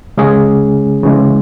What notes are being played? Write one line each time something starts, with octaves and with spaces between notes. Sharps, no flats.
C#3 G#3 C#4 G#4
C#3 E3 G#3